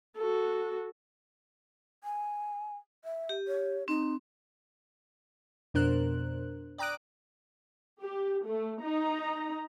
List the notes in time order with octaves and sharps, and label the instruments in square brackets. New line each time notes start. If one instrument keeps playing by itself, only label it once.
[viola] F#4 A4
[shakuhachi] G#5
E5
[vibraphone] G4
[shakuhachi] C#5
[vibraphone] C4 [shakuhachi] D#4
[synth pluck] F2 B2 D4 A#4 C5 F#6
D5 G5 A#5 D#6 F#6 D7
[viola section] G4
A3
D#4 A#5